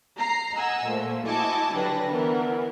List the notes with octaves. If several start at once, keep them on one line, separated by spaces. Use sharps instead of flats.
A#5 C7
D#5 F#5 G#5 A#5 E6
A#2 F3 A3 A#3
E4 F#4 D#5 G#5 A5 D6
D3 F#3 G3 D4 B4 A#6
E3 B3 A#4